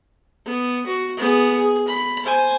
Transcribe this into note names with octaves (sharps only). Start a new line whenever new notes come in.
B3
F#4
B3 G#4
G#4
B5
C5 G#5